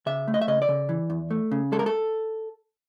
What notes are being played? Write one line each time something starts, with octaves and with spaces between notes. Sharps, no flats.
C#3 E5
A3
D#5
E5
C#3 D#5
D5
C#3
E3
E2
A3
C#3
G#3 A4
A#4
A4